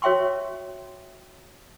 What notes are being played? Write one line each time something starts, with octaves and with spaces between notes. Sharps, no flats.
F#4 C#5 E5 G5 C6 C#6